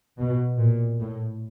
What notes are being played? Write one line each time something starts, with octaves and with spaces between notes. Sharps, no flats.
B2
A#2
A2